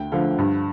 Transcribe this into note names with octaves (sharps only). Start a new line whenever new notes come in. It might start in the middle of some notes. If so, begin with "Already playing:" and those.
Already playing: D2 G5
D3 F3 F5
G2